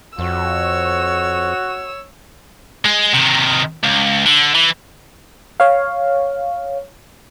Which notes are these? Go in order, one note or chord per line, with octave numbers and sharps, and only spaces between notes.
F2 F#4 C#5 E6
G#3
C3 D#3
C#2
D3
E3
C#5 F5